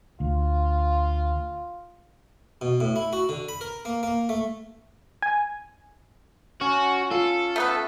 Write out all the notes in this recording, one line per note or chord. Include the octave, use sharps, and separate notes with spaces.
D2 F4
B2
A2
E4
F#4
D3
B5
A#4
A#3
A#3
A3
G#5
C#4 F#4
F4 A4
A3 B3 B4